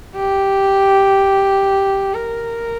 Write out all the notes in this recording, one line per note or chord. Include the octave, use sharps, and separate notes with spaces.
G4
A#4